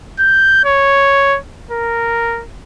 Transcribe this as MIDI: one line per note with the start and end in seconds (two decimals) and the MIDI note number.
0.19 0.60 91
0.65 1.38 73
1.71 2.43 70